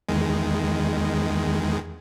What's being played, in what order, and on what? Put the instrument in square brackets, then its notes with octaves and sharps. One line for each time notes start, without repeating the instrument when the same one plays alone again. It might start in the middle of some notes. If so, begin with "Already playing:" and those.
[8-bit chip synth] E2 D#3 G#3